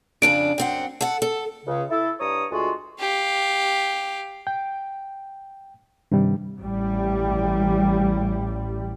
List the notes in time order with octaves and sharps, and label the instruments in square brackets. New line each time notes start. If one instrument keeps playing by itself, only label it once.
[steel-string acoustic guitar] F2 C#3 D4 [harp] D7
[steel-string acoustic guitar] F#2 C4 F#5
A4 F#5
A4
[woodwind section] C#2 C#3
E4 A4
G2 C#5 A#5 D#6
D2 G#3 F4 F#4
[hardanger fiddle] G4 F5
[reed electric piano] G5
G2 C3 D#3 G3
[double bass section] A1 G3